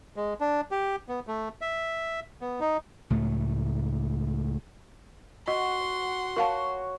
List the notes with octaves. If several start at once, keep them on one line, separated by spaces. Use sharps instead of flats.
G#3
D4
G4
B3
A3
E5
B3
D#4
C#2 A2 A3
F#4 D#5 F#5 C6
F#4 A#4 C#5 F5 A5